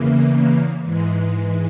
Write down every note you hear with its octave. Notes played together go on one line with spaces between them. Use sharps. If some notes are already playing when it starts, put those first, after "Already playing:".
Already playing: E2 C#3 E3 A#3
G#2 E3 G#3